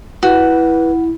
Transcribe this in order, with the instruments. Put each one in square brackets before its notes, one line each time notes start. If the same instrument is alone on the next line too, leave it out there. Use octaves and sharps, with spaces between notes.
[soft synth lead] E4 [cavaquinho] F#4 [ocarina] B4